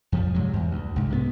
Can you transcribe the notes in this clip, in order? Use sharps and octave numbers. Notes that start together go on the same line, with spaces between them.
F2 F3 G3
G#2 C3 F#3
E2
D2
C2 G#2
C3 A3 B3